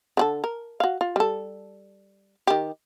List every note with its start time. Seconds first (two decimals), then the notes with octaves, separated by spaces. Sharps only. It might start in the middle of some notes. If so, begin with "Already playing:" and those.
0.17 D3 F#4 A4
0.44 A#4
0.80 F#4 F5
1.01 F4
1.16 G3 A4
2.47 D#3 G4